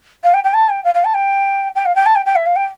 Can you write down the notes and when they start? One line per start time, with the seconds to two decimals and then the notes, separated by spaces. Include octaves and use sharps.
0.23 F5
0.34 G5
0.44 G5
0.53 A5
0.69 G5
0.84 F5
0.94 F5
1.04 A5
1.14 G5
1.75 G5
1.85 F5
1.95 G5
2.06 A5
2.15 G5
2.26 G5
2.35 E5
2.46 F5
2.56 G5